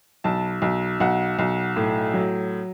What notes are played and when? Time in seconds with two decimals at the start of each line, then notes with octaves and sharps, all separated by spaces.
0.24 B1 A5
0.62 B1
1.00 B1 F#5
1.39 B1
1.76 A2
2.14 F#3